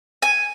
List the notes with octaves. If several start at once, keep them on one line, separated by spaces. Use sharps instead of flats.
G#5